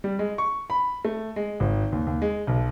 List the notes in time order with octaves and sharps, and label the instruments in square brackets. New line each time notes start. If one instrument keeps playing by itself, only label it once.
[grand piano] G3
G#3
C#6
B5
A3
G#3
G#1
D#2
D#2
G#3
B1